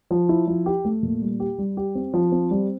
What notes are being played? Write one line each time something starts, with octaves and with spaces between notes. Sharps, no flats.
F3
E4
F3
G4
A3
A#2
G3
G4
G3
G4
C4
F3
C4
G3